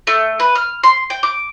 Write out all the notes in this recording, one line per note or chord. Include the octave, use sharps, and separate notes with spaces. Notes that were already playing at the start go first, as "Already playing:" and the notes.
A3
B4
F6
C6
G5
D6